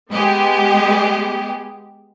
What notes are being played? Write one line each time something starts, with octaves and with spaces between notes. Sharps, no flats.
G#3 B3 G4 G#4